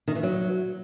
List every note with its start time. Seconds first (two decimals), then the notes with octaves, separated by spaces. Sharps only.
0.08 D#3
0.15 E3
0.23 F#3